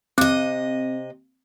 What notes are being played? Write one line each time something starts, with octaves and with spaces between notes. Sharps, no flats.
C3 C4 D#5